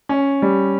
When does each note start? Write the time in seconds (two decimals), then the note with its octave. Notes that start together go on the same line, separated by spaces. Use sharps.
0.09 C#4
0.42 G3